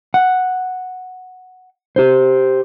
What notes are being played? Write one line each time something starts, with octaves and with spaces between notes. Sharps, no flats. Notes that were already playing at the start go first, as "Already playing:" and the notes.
F#5
G4 C5